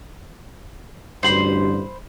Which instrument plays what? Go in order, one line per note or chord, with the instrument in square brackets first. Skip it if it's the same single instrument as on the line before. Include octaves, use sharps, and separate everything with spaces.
[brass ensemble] A1 D2 G2 [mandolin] C5 B5 C6